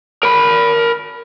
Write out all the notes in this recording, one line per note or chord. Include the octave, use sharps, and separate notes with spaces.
A#4 B5